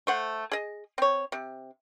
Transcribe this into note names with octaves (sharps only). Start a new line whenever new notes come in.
A3 C5 F#5
G#4 D#5
C4 C#5
C3